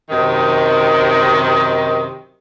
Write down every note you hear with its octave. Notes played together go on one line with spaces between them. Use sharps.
F#2 C3 D#3